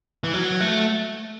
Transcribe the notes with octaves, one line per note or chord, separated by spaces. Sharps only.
E3
F#3
A3